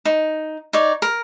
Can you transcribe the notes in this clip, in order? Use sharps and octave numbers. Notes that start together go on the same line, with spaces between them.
D#4
D#4 C#5 D5
A#4